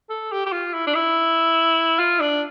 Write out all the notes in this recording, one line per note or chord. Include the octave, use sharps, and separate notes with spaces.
A4
G4
G4
F4
E4
D4
E4
F4
D4